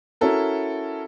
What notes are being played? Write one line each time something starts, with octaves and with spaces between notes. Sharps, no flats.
C#4 E4 F#4 A4 A#4